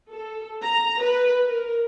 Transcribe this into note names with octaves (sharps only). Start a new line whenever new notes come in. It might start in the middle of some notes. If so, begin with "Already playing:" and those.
A4
A#5
B4
A#4